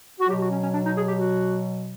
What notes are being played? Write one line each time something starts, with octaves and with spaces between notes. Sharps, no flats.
F#4
B2 F#3 G4
F#4
C#4
C#4
D4
D#4
G#4
G4
F#4